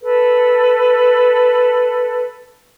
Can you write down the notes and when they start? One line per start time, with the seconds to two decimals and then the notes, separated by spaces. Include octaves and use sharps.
0.01 A4 B4